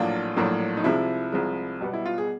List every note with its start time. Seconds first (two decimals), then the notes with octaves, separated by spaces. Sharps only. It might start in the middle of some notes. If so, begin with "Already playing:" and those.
Already playing: A#1 A2 F#3 A#3 D4 F4
0.36 A#1 A2 F#3 A#3 D4
0.77 D#4
0.84 C2 C3 F3 G#3 E4
1.32 C2 C3 F3 G#3
1.81 B1 B2 G3 B3
1.93 E4
2.06 F4
2.18 G#4